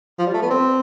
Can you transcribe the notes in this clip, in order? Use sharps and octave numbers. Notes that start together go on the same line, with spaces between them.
F3
G3
A3
B3
C4